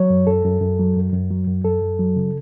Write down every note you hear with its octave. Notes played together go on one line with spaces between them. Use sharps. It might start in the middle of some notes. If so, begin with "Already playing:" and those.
Already playing: F#3 C#5
F#2
F#2 A4
F#2
F#2
F#3
F#2
F#2
F#3
F#2
F#2 A4
F#2
F#3
C#3